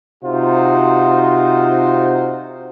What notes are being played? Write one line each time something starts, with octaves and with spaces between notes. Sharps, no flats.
C3 D#4 F4 F#4 C5